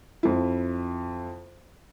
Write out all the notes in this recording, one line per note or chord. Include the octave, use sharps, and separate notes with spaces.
F2 E4